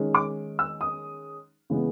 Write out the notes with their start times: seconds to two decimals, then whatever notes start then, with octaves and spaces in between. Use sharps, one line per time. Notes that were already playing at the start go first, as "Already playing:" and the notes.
Already playing: D#3 G#3 C#4
0.15 D6
0.59 E6
0.81 D#6
1.70 C#3 E3 G#3 B3